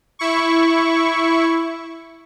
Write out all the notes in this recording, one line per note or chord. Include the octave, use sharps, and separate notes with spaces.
E4 C#6